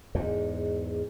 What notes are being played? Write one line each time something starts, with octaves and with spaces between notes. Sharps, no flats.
E2 G#2